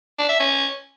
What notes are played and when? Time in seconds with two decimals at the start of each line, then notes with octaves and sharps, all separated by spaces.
0.18 D4
0.29 E5
0.40 C#4